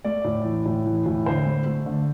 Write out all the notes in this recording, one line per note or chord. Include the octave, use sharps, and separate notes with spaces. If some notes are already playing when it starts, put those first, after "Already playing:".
A3 D5
A2
E3
A2
E3
A2
D3 C5
A3
A3
D3